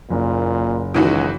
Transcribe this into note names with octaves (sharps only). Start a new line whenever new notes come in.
F#1 A#2
C#2 D#3 E3 F#4